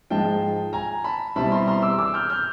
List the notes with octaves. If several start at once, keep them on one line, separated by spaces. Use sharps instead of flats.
G#2 F3 G#3 G5 A5
G#5 A#5
A5 B5
B2 G3 C4 E4 A5 B5
A#5 C6
A#5 C6
D6 E6
D6 E6
F6 G6
F6 G6